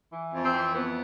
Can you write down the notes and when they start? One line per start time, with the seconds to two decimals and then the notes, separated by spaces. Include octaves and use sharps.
0.13 E3
0.33 F2
0.43 C4
0.53 E3
0.74 F2 B3